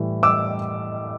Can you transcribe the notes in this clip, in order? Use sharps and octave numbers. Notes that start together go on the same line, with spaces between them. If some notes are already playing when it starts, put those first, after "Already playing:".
Already playing: A2 E3 G3
D6 E6